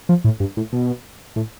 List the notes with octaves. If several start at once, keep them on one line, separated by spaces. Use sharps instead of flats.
F3
A2
G2
A2
B2
A2